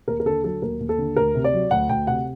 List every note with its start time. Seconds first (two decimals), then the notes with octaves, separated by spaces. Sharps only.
0.08 D#2 A#4
0.20 A#4
0.26 D3 A4
0.44 F#3 A4
0.62 D#2 A#4
0.80 D#2
0.89 A4
0.98 D3
1.16 D2 A#4
1.35 C3
1.44 D5
1.53 F#3
1.71 D2 F#5
1.89 D2 G5
2.07 C3 F#5